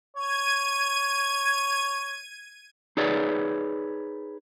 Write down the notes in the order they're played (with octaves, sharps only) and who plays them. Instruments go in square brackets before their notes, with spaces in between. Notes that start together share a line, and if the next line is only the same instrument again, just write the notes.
[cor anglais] C#5 [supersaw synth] G#6 D#7
[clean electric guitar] D#4 G#4 B4 C#5 D5